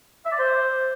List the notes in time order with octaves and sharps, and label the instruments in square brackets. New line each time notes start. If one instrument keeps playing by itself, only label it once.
[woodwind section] E5
D5
C5